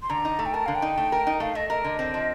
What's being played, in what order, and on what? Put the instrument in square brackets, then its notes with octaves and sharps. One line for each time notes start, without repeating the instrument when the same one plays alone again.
[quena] C6
[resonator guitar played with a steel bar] D3 [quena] A#5
[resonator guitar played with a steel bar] D#4
A3
[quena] G5
[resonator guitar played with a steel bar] A#4 [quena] A5
[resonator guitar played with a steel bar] D3 [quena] F5
[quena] G5
[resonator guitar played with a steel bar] D#4
A3
A#4
D#4
[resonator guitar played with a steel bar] A3 [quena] F5
[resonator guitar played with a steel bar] A3 [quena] D#5
[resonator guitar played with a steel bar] A#4 [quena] D#5
[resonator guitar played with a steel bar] D3
C4
F3